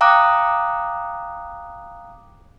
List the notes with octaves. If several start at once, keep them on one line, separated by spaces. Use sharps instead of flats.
F5 G5 A#5 D6 D#6 F#6